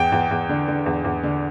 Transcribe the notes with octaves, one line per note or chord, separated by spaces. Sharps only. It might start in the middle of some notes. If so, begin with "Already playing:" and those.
Already playing: E2 G5
E2
E2
D3
D3
E2
E2
D3